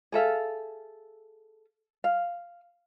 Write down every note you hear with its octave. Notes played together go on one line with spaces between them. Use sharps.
G#4 A4 E5 F5
F5